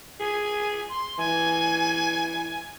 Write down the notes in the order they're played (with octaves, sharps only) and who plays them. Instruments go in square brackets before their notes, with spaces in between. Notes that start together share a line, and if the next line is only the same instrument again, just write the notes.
[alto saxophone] G#4 [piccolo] G#5
[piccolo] C6
[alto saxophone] E3 [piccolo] G#5